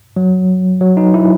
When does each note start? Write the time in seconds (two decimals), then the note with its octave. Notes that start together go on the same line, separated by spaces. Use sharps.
0.16 F#3
0.81 F#3
0.97 D#4
1.14 E4